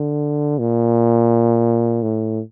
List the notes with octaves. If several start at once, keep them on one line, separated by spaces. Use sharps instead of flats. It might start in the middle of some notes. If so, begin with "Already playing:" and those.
Already playing: D3
A#2
A2